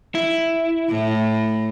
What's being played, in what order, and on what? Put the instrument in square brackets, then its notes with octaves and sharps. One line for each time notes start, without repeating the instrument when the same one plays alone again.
[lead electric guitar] E4
[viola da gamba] A2